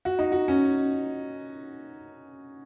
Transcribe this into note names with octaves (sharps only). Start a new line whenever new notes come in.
F#4
D#4
F#4
C#4